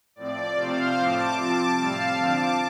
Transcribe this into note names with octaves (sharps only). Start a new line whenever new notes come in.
A2 F3 C4 D5
C3 F3 A3 C4 C5 F5
A2 F3 A3 C4 A5 D6
C3 F3 C4 A5 D6
A2 G3 C4 F5 A5
D3 F3 C4 A5 D6